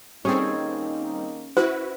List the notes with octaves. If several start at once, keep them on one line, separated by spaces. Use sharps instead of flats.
D#3 G3 A#3 C4 C#4 D#4 G#4 A4
E4 F#4 B4 C5